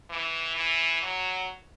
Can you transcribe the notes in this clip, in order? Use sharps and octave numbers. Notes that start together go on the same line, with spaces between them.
E3
E3
F#3